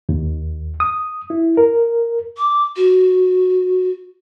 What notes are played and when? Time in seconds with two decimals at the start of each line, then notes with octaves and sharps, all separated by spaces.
0.09 D#2
0.80 D#6
1.30 E4
1.57 A#4
2.37 D6
2.76 F#4